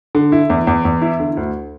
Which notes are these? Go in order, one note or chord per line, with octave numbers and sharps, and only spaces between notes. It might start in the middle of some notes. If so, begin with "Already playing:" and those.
D3
E4
E2
E2
E2
E4
D3
D2